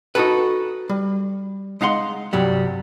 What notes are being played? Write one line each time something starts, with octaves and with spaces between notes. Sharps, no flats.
D#4 F#4 G#4 A4 B4
G3
G#3 D#4 F5 F#5 C6
C2 G2 F#3 G3